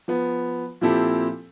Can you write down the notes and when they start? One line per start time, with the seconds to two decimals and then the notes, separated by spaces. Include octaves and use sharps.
0.08 F3 B3
0.81 A#2 F3 C4 E4 G4 A4